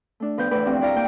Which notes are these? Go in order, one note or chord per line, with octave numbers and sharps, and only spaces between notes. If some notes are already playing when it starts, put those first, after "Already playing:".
A3 D4
A2 F3 B3 B4 G6
E2 A2 F3 B4 D6
G2 F3 C4 F#4 G4
E4 D5 F5 A#5
A#3 G5 D6